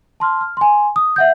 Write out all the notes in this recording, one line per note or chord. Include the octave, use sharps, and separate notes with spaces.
A5 C6 F6
F6
G#5 C6
D#6
E5 F#5 G6